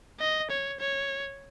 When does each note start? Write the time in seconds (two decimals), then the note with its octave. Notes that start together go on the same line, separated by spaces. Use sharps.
0.20 D#5
0.50 C#5
0.80 C#5